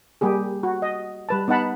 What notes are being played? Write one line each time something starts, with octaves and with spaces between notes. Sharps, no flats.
G3 A#3 G4 G#4
F#4
D#5
G3 B4 A5
B3 D#4 B4 F#5 A5 B5